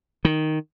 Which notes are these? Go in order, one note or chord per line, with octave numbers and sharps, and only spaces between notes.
D#3